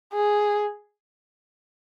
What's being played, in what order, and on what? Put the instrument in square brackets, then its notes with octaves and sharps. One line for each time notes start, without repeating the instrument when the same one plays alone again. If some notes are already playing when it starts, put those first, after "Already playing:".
[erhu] G#4